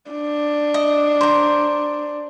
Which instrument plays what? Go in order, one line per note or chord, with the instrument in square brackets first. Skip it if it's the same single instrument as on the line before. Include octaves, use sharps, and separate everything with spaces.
[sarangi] D4
[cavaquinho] D#5
C5 A#5